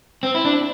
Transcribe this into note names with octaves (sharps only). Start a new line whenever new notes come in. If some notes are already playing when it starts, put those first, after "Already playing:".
C4
E4
D4